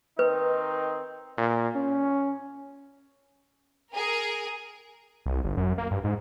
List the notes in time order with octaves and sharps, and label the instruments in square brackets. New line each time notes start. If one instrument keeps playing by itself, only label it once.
[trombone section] D#3 C4 D#4 [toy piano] B4
[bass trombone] A#2
C#4
[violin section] G#4 A#4
[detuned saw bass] C2
G1
F#2
A#3
G2
G#2